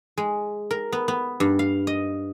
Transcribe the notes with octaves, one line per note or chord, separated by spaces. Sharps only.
G#3
A#4
B3
B3
G2
F5
D#5